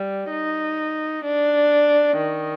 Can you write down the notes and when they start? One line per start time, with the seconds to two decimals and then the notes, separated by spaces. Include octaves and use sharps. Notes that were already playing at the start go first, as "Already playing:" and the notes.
Already playing: G3
0.31 D#4
1.24 D4
2.17 D#3